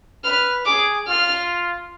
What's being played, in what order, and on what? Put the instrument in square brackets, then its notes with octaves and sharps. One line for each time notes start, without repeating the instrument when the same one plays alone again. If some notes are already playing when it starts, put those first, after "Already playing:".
[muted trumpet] B4 [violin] F6
[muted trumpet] G#4 [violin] D6
[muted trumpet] F4 [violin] F6